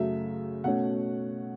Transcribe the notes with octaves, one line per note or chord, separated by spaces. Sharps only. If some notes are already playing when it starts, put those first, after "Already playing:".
Already playing: F#2 C#3 F#3 A3 E5
B2 A3 C#4 F#5